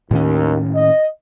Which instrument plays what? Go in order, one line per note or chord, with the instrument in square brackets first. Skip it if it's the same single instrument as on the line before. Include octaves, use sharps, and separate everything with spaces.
[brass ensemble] D#2 [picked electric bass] A2 D#3 C#4
[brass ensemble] D#5